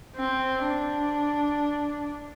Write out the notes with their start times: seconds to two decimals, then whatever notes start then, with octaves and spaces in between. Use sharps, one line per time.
0.16 C4
0.66 D4